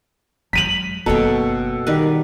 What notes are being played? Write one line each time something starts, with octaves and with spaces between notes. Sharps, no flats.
F#3 G#3 B6 D#7 F#7
F#1 B2 B3 A4 C#5 G5
D#3 G3 B4